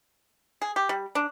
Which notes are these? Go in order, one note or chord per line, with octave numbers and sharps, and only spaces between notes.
G#4
G4
G3
D4